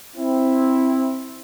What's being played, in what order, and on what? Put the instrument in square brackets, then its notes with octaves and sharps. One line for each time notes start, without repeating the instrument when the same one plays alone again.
[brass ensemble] C4 E4